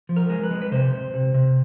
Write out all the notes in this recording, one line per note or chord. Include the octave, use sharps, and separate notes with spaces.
F3
A#4
G#3
B4
G#3
B4
C3 C5
C3
C3
C3